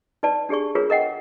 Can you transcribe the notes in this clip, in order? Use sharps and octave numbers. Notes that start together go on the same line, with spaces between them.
D#4 B4 D5 A5
D4 G4 G#4 D5 C#6
F4 G#4 A#4 B4 C#5
A#4 D#5 F#5 G5